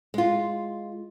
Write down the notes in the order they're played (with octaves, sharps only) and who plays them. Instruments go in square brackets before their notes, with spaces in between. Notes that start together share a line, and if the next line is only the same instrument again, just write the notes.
[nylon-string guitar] G#3 F4